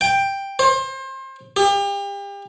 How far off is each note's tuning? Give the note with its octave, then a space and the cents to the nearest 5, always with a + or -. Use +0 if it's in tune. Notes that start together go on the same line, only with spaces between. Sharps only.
G5 +5
C5 +30
G4 +35